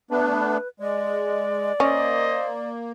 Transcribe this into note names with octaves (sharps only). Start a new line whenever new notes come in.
A3 B3 D4 B4
G#3 D5
A#3 C#4 C5 D#5